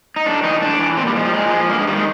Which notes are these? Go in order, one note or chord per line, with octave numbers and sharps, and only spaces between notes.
D#4
A2 D4
E3 D#4
A2 D4
E3
A#2 C4
G3
F3 G#3
G3
A#2 G#3
F3
G2 A#3
G#3
D#3 G3
G#3